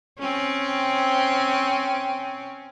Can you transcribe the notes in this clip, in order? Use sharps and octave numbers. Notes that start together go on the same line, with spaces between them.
C4 C#4